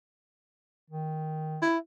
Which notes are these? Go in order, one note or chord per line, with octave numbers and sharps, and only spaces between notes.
D#3
E4